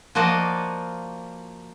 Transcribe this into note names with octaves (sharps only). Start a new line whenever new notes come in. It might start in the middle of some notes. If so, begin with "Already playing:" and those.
F3 A#3 F#4 D5 D#5